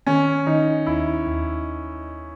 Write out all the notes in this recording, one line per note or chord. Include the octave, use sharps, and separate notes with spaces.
D#3 C#4
D#3 D#4
D#2 E4
D#2